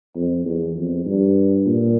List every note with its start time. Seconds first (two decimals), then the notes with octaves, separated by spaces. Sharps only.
0.15 F2
0.45 E2
0.76 F2
1.05 G2
1.66 A#2